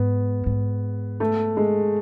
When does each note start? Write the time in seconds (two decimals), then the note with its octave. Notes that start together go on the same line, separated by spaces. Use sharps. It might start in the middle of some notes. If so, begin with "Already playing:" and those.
Already playing: G#2 B3
0.46 G#2
1.20 A3
1.57 G#3